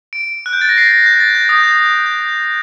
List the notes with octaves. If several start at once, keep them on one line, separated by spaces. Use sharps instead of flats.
D7
F#6
G6
A6
A#6
C7
A#6
G6
A6
G6
D#6
G6
G6